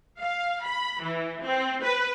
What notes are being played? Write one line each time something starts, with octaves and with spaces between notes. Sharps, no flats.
F5
B5
E3
C4
B4